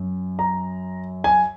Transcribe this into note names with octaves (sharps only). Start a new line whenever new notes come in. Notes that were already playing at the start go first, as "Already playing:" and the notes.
Already playing: F#2
A#5
G#5